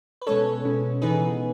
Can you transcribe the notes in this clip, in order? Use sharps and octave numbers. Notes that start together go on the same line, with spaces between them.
B4
B2 G#3 C#4 A4 C#5
B2 G#3 C#4
C#3 E3 B3 D#4 G#4 B4